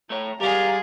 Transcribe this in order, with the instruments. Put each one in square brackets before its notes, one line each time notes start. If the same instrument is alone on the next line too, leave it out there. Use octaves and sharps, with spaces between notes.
[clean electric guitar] A3 C#5 [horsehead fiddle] A#5
[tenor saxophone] G3 [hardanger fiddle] G#3 G#4 [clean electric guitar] A#4 [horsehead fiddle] F5